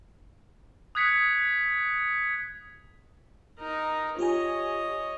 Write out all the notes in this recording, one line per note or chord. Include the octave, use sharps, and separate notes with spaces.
D#6 F#6 G#6 B6 C#7
D#4 A#4
F4 G4 C#5 D#5 G#5